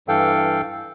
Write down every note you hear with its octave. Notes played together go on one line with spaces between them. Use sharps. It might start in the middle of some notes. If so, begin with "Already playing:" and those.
G2 E3 A4 F5 G5